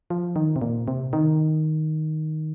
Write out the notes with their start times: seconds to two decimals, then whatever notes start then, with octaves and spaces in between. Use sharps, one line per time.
0.10 F3
0.36 D#3
0.56 C3
0.62 A#2
0.88 C3
1.13 D#3